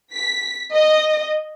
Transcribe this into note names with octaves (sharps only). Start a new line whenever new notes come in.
B6
D#5